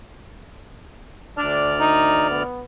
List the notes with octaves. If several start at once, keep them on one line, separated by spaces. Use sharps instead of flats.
D2 D4 D5 F6
D#4
B3